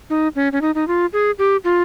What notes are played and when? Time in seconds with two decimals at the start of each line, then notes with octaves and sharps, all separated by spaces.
0.10 D#4
0.36 C#4
0.52 C#4
0.61 D#4
0.75 D#4
0.88 F4
1.13 G#4
1.38 G4
1.64 F4